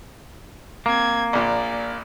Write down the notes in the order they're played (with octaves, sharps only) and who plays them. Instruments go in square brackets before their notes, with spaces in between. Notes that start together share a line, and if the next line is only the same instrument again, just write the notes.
[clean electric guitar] A#3 [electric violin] C4 G#6
[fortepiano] A#1 A#2 [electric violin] D5